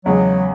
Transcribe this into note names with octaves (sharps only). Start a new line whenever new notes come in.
E2 C#3 F#3 G#3 C#4 G#4